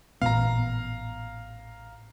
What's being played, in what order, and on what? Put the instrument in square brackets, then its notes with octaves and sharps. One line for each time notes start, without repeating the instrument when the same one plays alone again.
[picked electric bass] A1 A#2 B3 [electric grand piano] F5 A#5